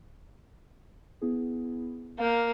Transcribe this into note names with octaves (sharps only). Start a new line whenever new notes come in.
B3 E4 G#4
A#3 F5 F6 G6